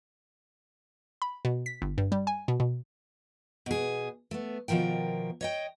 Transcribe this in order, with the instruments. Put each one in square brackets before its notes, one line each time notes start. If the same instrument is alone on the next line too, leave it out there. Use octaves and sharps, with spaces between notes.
[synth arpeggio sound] B5
B2
B6
G1
G2
G3
G#5
B2
B2
[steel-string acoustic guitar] B2 G#4
A3 B3
B2 D#3 F3 A#4 G5
C#5 D#5 G5